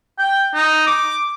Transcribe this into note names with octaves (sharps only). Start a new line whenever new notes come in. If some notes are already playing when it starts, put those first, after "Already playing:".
G5
D#4
D6